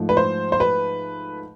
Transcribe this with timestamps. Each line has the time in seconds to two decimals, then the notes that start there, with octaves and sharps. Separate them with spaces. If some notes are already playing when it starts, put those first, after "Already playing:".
Already playing: G#2 F3 A3
0.09 B4
0.17 C5
0.52 C5
0.60 B4